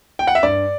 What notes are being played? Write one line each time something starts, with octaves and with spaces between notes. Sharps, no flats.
G5
F#5
E5
G2 D5